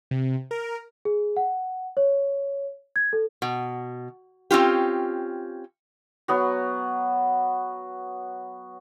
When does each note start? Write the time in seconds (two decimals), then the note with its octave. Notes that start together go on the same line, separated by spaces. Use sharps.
0.11 C3
0.51 A#4
1.05 G#4
1.37 F#5
1.97 C#5
2.96 G#6
3.13 A4
3.42 B2
4.51 C4 C#4 F4 G4
6.28 F#3 B3 F#4